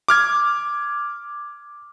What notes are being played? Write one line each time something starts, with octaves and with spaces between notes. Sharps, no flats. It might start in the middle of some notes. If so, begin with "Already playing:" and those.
D6 F6 G#6